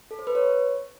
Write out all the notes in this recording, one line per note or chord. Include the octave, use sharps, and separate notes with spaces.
A4
C5
B4
C#5